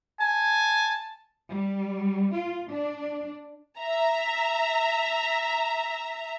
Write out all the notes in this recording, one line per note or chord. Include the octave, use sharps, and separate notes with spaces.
G#5 A5
G3
F4
D4
E5 A#5